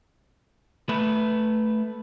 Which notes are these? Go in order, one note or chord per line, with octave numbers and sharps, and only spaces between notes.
A3 B4